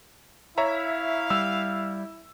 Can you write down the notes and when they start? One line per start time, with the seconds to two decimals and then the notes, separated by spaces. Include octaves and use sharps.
0.58 E4 C#5 E5 F5 A#5
1.30 G3 E6